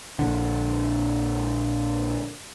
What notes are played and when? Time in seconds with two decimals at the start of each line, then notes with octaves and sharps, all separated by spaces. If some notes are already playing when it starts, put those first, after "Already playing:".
0.19 A#1 D3